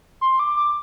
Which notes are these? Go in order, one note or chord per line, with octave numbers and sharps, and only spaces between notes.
C6
D6
D6